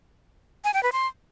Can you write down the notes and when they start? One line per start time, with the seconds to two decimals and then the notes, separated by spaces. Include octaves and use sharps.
0.64 G#5
0.74 G5
0.83 B4
0.92 C6